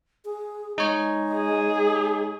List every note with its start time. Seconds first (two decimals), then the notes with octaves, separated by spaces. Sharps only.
0.25 G#4
0.78 G#3 D#4 C#5
1.35 G#4